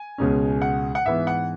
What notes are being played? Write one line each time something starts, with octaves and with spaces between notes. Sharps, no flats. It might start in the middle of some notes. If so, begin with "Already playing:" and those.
Already playing: G#5
C#2 B2 G#3 C#4
F#5
F#5
G#2 E3 B3 E5
F#5